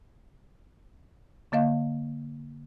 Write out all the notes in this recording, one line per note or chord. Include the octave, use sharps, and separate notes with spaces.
D3 A#3 D#5 F5